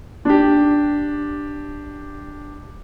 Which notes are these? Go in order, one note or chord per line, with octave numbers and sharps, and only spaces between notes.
D4 G4